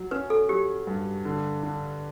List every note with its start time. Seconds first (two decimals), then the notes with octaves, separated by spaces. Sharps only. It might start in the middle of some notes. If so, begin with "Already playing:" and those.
Already playing: F#3
0.11 C#4 B4
0.30 A4
0.49 F#3 G4
0.87 G2
1.25 D3
1.63 D3